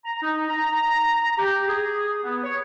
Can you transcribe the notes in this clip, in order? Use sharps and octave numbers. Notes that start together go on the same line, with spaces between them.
A#5
D#4
A#5
G4
G#4
B3
C#5